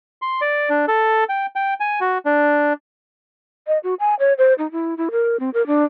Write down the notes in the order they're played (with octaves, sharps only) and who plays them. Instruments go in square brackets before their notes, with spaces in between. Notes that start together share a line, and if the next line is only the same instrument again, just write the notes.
[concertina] C6
D5
D4
A4
G5
G5
G#5
F#4
D4
[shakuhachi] D#5
F#4
G#5
C#5
C5
D#4
E4
E4
A#4
C4
A#4
D4